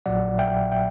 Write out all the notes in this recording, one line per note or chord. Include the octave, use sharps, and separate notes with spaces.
A#1 A#2 F#3 D5 F#5
E5 G5
E5 G5